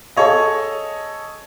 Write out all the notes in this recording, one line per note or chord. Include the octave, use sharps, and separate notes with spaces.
G#4 A4 C#5 D#5